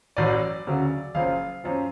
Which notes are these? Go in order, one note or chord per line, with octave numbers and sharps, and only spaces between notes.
A1 A2 F#3 D5
D2 C#3 F#3
F#1 F#2 F3 F5
F#2 F3